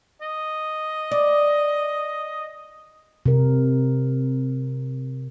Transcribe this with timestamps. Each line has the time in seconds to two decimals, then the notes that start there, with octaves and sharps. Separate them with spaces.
0.21 D#5
1.11 D5
3.26 C3 A#4